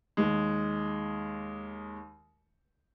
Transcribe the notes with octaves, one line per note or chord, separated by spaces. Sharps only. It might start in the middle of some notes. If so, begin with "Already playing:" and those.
D#2 G#3